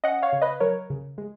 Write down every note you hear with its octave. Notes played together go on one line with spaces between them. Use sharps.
C#4 D#5 F#5
C#5 F5
C#3
B4 D#5
F#3 A#4 C#5
C#3
G#3